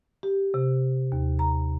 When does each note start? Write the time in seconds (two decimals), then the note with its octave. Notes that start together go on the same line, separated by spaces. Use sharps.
0.23 G4
0.54 C3
1.12 D#2
1.39 A#5